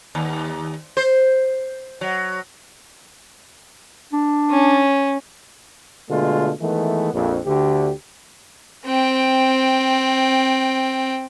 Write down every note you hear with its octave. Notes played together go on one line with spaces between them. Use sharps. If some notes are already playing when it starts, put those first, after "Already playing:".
D#2
C5
F#3
D4
C#4
B2 D3 G#3 A3 F4
D#3 E3 G#3 A3 B3
A#1 F2
D2 D3 G4
C4 G5